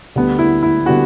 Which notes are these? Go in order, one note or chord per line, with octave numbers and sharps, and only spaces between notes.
D2 D3 G3 B3
E4
E4
D3 G3 B3 F#4